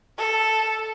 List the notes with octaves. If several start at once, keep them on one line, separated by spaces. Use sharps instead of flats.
A4